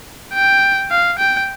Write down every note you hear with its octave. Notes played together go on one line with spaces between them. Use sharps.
G5
F5
G5